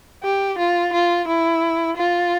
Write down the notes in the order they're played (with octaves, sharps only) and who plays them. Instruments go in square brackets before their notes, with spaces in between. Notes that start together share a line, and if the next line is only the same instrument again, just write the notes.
[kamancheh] G4
F4
F4
E4
F4